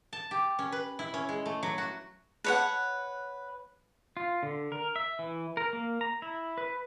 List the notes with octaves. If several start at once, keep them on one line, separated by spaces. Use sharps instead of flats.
A5
G4
C#4
B4
E4
C#4
G#3
A3
F#3
F#4
B4 C#5 F#5
F4
D3
A#4
E5
E3
A#4
A#3
A#5
E4
B4